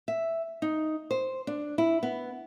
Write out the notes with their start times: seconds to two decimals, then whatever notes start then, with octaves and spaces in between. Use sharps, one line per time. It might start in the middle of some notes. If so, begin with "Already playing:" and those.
0.08 E5
0.62 D#4
1.11 C5
1.47 D4
1.78 E4
2.03 B3